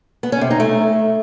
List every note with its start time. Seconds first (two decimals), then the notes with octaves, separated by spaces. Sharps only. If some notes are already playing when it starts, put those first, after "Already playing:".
0.23 B3
0.32 C#4
0.41 C3
0.51 D#4
0.60 A3